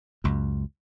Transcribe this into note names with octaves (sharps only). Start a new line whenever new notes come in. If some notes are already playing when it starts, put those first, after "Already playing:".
C#2 F#2